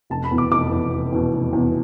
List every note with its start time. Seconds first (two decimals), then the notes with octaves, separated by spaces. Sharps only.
0.10 F1 A5
0.24 B5
0.31 E2 B2
0.38 D6
0.51 F1 D6
0.71 E2 B2
0.93 F1
1.12 E2 B2
1.33 F1
1.53 E2 B2